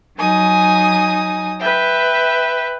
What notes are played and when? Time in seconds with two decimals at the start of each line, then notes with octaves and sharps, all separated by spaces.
0.18 F#3 D#4 G#5 D#6
1.61 B4 E5 G5